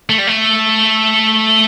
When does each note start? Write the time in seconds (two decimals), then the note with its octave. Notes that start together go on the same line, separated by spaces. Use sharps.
0.09 A3
0.18 G3
0.27 A3